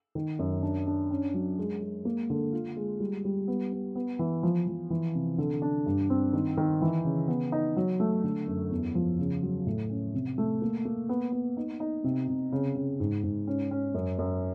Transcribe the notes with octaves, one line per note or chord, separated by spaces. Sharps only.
D#3
F#2
D4
D4
C#4
F#3
G#3
G#3
A#3
D3
F4
G#3
G3
G3
B3
B3
B3
E3
F3
F3
E3
C3
D3
D4
G2
C4
D#3
D#3
E3
C#3
B3
D#4
F#3
A3
D3
F#2
E2
F3
C#3
F#3
A2
C#4
C3
A3
A#3
A#3
B3
B3
D#4
D#4
C3
C3
C#3
C#3
G#2
G#2
C#4
C#4
F#2
F#2